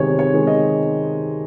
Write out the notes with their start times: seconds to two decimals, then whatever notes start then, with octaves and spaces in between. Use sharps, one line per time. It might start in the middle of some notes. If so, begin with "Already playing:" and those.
Already playing: C3 D#3 G#3 C5 C#5
0.19 C#5
0.34 D#3 G#3
0.47 D#5